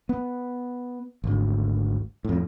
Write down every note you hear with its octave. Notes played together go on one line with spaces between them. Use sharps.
B3
G#1 D2
F2 A2